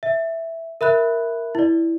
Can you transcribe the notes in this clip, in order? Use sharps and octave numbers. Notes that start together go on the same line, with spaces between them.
E5
A#4 E5 B5 F#6
E4 D5